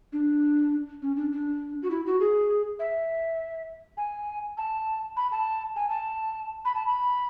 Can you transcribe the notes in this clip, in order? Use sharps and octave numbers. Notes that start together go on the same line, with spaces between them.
D4
C#4
D4
D4
F#4
E4
F#4
G#4
E5
G#5
A5
B5
A5
G#5
A5
B5
A5
B5